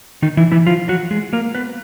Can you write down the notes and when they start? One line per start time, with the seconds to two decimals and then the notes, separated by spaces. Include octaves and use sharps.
0.22 D#3 D#4
0.37 E3 E4
0.52 E3 E4
0.67 F3 F4
0.88 F#3 F#4
1.11 G#3 G#4
1.33 A#3 A#4
1.55 B3 B4